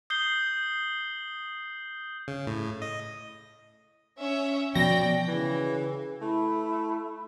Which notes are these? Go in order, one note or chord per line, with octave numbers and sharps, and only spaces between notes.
D#6 G6 C7 G7
C#3
A2
D#5
C#4 C#5 E5
B2 F3 D5 G5 A#6
C#3 E3
A3 E4